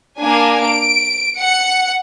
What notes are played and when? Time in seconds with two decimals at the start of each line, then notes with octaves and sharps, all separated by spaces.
0.20 A#3 D4 G#5
0.64 D7
1.38 F#5 C#7